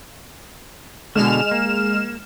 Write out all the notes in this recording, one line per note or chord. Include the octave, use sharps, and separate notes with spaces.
B2 D3 G#3 F6 E7
A#3